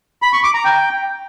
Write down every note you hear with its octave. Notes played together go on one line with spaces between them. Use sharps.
B5
C#6
D6
A#5
G5